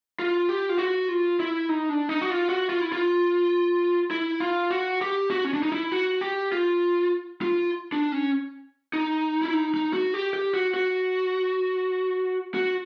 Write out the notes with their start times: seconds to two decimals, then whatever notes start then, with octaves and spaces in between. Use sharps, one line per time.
0.19 F4
0.49 G4
0.69 F4
0.79 F#4
1.09 F4
1.40 E4
1.69 D#4
1.89 D4
2.09 D#4
2.22 F#4
2.30 F4
2.49 F#4
2.69 F4
2.81 E4
2.92 F4
4.11 E4
4.40 F4
4.71 F#4
5.01 G4
5.31 F#4
5.44 C#4
5.54 D4
5.63 D#4
5.72 E4
5.92 F#4
6.21 G4
6.52 F4
7.42 F4
7.92 D4
8.12 C#4
8.93 D#4
9.42 E4
9.53 D#4
9.74 D#4
9.93 F#4
10.14 G4
10.34 G4
10.54 F#4
10.74 F#4
12.54 F#4